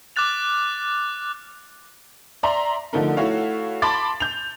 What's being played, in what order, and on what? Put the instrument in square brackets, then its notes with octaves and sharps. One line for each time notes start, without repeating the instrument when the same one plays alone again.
[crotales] D6 F6 F#6 A6 F7
[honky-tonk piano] D5 E5 A#5 C6
D3 F3 A3 D#4 A#4
A3 E4 F#4 C#5 F5
A5 B5 C6 D6 A6
G6 F7